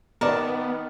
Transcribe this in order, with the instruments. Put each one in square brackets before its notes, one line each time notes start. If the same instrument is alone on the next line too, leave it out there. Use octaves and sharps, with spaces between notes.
[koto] D#3 A5 [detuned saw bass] B3 [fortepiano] A#4 D5